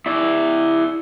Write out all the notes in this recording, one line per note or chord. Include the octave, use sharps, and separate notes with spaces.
E4 D5